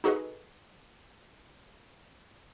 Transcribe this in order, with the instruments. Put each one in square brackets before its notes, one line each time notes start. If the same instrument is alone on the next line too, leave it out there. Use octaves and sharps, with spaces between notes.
[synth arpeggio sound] D#4 F#4 G#4 A4 B4 D#5